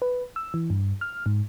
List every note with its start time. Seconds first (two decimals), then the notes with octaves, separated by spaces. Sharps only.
0.02 B4
0.36 E6
0.54 E3
0.70 G2
1.01 F6
1.26 G#2